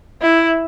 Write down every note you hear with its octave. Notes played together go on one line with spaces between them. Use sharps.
E4